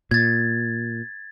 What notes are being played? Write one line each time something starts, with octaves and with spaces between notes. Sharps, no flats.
A#2 G#6 A6